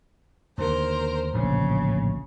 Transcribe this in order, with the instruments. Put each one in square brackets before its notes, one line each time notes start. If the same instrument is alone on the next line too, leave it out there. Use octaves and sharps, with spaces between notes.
[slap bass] D#2 D3 [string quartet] A#4 C5
[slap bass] D1 A#1 A2 [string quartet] C#3